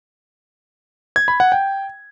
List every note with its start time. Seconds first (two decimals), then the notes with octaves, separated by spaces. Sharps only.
1.16 G#6
1.28 B5
1.40 F#5
1.52 G5